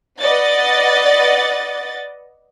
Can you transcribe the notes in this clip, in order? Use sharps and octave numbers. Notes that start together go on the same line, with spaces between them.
B4 D5 D#5 F#5 A6